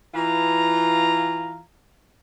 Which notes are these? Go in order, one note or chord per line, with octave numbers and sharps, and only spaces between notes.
E3 F4 A#5